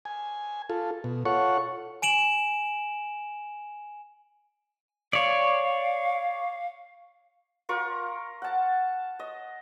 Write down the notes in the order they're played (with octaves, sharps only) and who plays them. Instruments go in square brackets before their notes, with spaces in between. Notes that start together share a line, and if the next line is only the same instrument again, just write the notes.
[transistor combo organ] G#5
F4 A4
B2
F4 A4 C#5 F#5 C#6
[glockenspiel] G#5 D7 E7 F#7
[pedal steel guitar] C#5 D5 [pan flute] F5
[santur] F4 A#4 C#6
F#5 A5
D#5